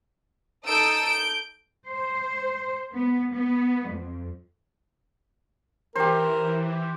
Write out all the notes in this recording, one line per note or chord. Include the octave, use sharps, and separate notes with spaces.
D#4 A4 D#6 E6 G6 D7
G6 D7
C5
B3
B3
F2
E3 G4 A#4 C5